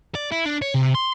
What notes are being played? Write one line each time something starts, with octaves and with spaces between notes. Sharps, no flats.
D5
E4
D4
C#5
C3
C6